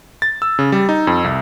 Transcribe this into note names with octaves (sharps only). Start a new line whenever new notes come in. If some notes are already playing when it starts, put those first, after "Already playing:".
A6
E6
C#3
G3
D#4
F2
C2